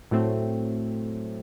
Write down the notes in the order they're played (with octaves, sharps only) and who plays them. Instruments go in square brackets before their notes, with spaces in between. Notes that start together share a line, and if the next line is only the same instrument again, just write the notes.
[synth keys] A2 F#3 A3 C4